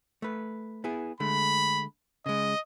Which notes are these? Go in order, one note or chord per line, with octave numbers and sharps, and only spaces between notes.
A3 B4
B3 E4 G#4
D3 G#3 A3 B5
C#3 G#3 D#5